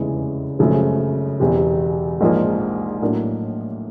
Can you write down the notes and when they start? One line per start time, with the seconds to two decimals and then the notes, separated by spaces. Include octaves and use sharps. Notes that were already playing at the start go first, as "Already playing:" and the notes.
Already playing: F1 E2 C#3 E3 G#3
0.59 G#1 F#2 C#3 F3 A3
1.40 E1 E2 C3
2.21 A#1 G#2 F3 A#3
3.01 A2 F#3 A#3 D4